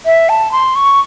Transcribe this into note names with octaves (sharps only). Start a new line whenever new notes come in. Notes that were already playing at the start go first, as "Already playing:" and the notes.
E5
A5
C6
C#6